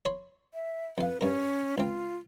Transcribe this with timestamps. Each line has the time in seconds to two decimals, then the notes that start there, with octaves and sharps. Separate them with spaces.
0.05 C#5 B5 C6
0.54 E5
0.98 F2 B4 F5
1.21 G2 C#4 A#4
1.78 C#2 C4 F4